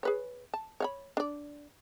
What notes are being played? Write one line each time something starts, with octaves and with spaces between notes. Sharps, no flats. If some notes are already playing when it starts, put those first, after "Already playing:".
G#4 B4 C#5
A5
C#5 F5 B5
D4 D5